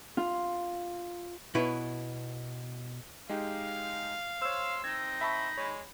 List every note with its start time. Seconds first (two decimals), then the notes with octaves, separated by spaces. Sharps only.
0.17 F4
1.55 B2 E4 B4 C#5
3.29 G#3 D#4 G4 F5
4.42 C5 C#5 C6 E6
4.84 C4 D#4 G#6
5.21 E5 A5 B5 C#6
5.57 G#3 C#5